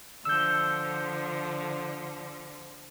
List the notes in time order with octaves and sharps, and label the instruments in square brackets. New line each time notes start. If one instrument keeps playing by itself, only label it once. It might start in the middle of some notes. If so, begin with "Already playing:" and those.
[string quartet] D3 F3 [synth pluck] E6 G6